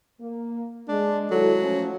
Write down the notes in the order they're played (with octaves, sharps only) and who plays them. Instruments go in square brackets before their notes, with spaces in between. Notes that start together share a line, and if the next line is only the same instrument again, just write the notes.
[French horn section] A#3
[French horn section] G#3 [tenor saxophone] D4
[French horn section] D#3 E4 A4 [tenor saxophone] F#3
[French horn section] F3 A3 C#4